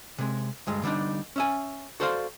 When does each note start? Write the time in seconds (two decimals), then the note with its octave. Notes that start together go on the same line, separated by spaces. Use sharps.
0.18 C3 G#3
0.67 D2 G2 G#3
0.84 D3 G3 A#3 D4 D#4
1.36 C#4 E5 G#5
2.00 F#4 A4 C5 D5 F5 C6